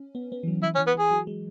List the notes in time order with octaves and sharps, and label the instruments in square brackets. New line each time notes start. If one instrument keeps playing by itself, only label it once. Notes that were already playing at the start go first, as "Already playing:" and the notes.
Already playing: [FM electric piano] C#4
B3
B3
E3
F#3
[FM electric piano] E3 [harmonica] E4
[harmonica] C#4
[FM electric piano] E3
[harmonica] B3
[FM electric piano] E3 [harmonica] G#4
[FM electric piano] F#3
G#3